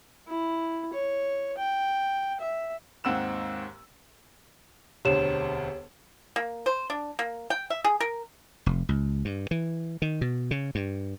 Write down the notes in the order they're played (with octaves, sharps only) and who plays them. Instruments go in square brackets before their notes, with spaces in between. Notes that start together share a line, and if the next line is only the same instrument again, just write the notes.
[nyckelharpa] E4
C#5
G5
E5
[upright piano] D#2 G#2 C4 F#5 E6 E7
[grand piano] E1 D2 C4 [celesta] G4 C#5 E7
[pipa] A#3
C5
D4
A#3
G5
E5
G#4
A#4
[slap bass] F1
C#2
G2
E3
D#3
B2
C#3
G2